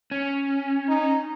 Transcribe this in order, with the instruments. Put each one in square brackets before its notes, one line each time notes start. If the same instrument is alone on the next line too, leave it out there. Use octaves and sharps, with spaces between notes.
[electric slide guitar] C#4
[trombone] D#4